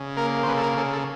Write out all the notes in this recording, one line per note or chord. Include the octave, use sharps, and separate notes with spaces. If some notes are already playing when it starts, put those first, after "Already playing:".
Already playing: C#3
A#3 A#4
C5
C#3 B4
A4
A#4
C#3 A4
A4